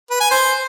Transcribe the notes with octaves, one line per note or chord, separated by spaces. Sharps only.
B4
G#5
C5